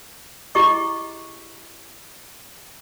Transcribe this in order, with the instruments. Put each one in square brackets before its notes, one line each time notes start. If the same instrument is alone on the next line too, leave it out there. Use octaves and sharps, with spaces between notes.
[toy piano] E4 G4 G#4 D#5 C#6 D6